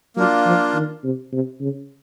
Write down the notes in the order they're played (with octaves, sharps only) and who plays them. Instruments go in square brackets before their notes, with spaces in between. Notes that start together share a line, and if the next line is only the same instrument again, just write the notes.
[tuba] F#3 [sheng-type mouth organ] A#3 D4 F4
[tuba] F3
D#3
C3
C3
C#3